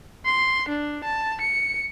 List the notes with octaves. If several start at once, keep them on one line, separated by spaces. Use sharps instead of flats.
C6
D4
A5
C#7